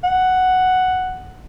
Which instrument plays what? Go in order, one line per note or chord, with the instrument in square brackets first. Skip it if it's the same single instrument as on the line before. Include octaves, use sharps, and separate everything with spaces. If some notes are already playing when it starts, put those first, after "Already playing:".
[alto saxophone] F#5